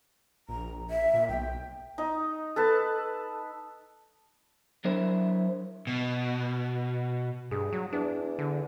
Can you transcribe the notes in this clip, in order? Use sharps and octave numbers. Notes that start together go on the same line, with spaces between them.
A#1 A#5
E5
A#2
B1 G5
D#4
A4 B4 A5
F#3 D4 E4 A#4 C5 C#5
B2
G2 G#4
F#3
E2 D4
D3